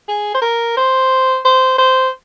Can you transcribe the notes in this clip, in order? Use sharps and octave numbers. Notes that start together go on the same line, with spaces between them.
G#4
C5
A#4
C5
C5
C5